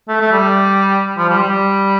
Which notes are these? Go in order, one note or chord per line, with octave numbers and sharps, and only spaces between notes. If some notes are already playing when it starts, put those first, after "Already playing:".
A3
A3
G3
F3
G3
G3